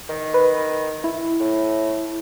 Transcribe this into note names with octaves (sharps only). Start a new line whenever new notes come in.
D#3
B4
E4
A2